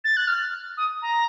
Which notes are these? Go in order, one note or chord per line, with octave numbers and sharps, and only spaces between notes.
A6
F#6
F6
D#6
A#5